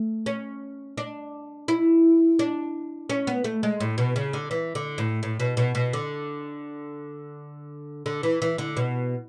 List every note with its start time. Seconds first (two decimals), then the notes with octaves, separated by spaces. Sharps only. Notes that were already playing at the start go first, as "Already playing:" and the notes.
Already playing: A3
0.26 C#4
0.98 D4
1.68 E4
2.39 D4
3.10 C#4
3.27 B3
3.44 A3
3.63 G#3
3.80 A2
3.98 B2
4.16 C#3
4.33 D3
4.51 E3
4.75 D3
4.98 A2
5.23 A2
5.40 B2
5.57 B2
5.75 B2
5.93 D3
8.06 D3
8.23 E3
8.42 E3
8.58 D3
8.77 B2